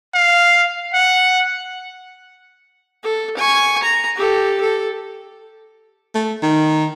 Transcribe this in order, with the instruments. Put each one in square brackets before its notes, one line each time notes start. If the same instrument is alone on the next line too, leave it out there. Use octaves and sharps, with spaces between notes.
[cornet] F5
F#5
[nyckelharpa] A4
G#5 C#6
A#5
G4 A4
A4
[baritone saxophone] A3
D#3